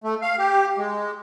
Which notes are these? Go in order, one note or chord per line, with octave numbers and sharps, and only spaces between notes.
A3
F5
G4
G#3